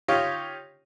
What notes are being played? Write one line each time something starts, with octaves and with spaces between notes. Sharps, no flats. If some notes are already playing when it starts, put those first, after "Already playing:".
D#4 F4 G4 C#5